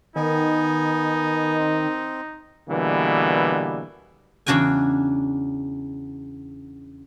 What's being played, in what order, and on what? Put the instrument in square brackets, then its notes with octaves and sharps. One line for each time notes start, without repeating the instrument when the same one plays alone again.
[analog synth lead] D#3 [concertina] B3 G#5 [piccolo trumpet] D#4
[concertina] C4
[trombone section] B2 D3 E3 G3 A#3
[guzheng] E2 C#3 D4 F#4 G5 G#5